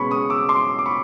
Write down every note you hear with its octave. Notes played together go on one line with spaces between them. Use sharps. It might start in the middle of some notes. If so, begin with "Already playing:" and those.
Already playing: B2 G#3 C#4 B5 C#6
C#6 D#6
D6 E6
C6 D6
D6
B5 C#6